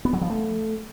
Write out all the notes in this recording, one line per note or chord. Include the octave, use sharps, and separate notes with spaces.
B3
F#3
F3
A3